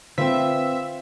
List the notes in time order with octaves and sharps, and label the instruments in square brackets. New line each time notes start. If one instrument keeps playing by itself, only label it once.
[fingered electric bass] D3 [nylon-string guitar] C4 B4 [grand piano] F4 C5 F5 [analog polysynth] E5